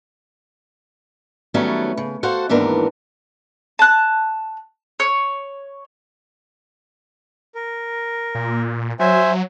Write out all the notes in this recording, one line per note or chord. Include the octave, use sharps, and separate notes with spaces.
D#3 F#3 G3 A3 B3 C#4
C#3
F#4 A4 C5 F5 F#5
D#2 G#2 E3 B3 D4 A#4
A5 F#6
C#5
A#4
A#2
F#3 C5 E5 G#5